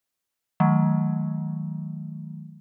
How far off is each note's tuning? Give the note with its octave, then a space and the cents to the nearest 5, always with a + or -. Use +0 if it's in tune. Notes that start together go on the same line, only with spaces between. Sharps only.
D#3 +25 F#3 +0 A3 -20